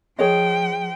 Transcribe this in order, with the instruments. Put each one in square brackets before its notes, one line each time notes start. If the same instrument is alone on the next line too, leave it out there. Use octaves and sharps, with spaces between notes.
[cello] F3 G5 [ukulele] G#4 C#5 D#5